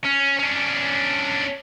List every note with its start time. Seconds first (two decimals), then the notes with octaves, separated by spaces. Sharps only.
0.05 C#4
0.39 C#4 D4